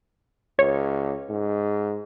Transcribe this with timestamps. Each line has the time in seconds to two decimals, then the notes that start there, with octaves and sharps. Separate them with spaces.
0.59 C#2 C#5
1.29 G#2